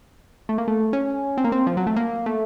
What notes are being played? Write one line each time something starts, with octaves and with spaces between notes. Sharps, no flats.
A3
A#3
A3
C#4
C4
A#3
C4
F3
F#3
A3
A#3
A3